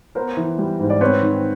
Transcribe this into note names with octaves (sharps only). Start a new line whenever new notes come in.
B3 A#4 C5
E3
G3
G#2
D5
C4 B4 C#5
D#3